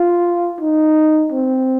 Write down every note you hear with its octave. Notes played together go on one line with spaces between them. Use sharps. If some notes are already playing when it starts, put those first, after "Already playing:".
Already playing: F4
D#4
C4